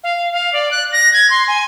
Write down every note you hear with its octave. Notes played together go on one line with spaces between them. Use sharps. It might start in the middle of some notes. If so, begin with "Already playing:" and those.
F5
F5
D5
F#6
A#6
G#6
C6
G#5